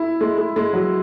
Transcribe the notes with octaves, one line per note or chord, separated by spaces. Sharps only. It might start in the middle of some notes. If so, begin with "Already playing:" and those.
Already playing: E4
G#3
G#3
G#3
F#3